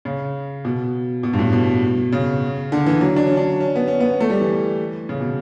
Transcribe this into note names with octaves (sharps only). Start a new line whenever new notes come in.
C#3
B2
B2
G2
A2
B2
C#3
D3
E3
F#3
D4
C#4
D4
C#4
B3
C#4
B3
A3
G3
E3
C#3
B2